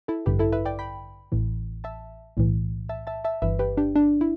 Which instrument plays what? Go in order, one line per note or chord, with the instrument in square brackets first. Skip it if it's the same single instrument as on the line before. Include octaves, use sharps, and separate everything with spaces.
[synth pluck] E4 A4
A1 G2 D3 G4 B4
E4 A4
B4 E5
D5 G5
G5 B5
A1 A2 E3
E5 A5
B1 A2 E3
E5 A5
E5 A5
E5 A5
G1 G2 E3 B4 E5
G4 B4
D4 G4
D4
E4